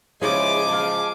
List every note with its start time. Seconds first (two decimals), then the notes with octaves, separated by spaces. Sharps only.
0.21 C#3 F3 G#3 E4 G#4 C#5 G#5 D6
0.69 F5 A5